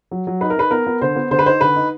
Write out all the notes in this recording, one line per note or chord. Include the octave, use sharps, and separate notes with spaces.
F#3
F#3
D#4 B4
A#4
D#4 B4
B3 A#4
B3
D3 C5
B3
D3 C5
B4
D#4 C5
D3 B4
D#4